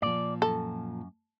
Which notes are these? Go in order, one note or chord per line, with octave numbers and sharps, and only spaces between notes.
A#2 F3 D5
F#2 A4